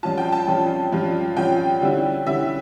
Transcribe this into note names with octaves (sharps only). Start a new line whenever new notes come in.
G2 F3 C#4 F4 A5
G5
A5
G2 F3 C#4 F4
G2 F3 C#4 F4
G2 F3 C#4 F4 G5
D3 G3 C#4 E4
D3 G3 C#4 E4 E5